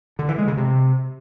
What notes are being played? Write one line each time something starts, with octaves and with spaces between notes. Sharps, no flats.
D3
E3
G#3
C#3
C3